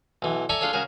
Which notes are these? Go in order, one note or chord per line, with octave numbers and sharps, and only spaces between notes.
B1 E3
A4 D5 E5 G#5 A#5 C#6
D4 F4 G#4 A4 C#5
C#3 F#4 G#4 A#4